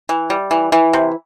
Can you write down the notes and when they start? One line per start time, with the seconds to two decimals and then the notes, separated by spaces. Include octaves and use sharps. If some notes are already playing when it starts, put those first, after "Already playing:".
0.09 E3
0.30 G3
0.51 E3
0.72 E3
0.93 C3